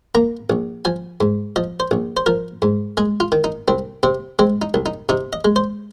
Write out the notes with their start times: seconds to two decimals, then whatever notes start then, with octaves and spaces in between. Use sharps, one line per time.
0.15 A#3 A#5
0.50 A#1
0.85 F3 G#5
1.21 G#2
1.56 F3 D#5
1.80 C5
1.91 A#1
2.17 C5
2.26 F3 A#4
2.62 G#2
2.97 G#3 G#4
3.20 F4
3.32 D#3
3.44 D#4
3.68 C2 C4
4.03 C3 C4
4.39 G#3 C4
4.62 D#4
4.74 C2
4.86 D#4
5.09 C3 D#4
5.33 D#5
5.45 G#3
5.56 C5